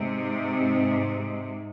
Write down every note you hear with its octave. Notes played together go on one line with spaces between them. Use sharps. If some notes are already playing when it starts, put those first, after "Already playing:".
Already playing: G#2 C3